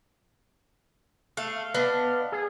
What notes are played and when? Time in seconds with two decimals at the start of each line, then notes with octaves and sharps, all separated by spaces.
1.37 A3 F5
1.74 B3 D4 D#5
2.32 G#4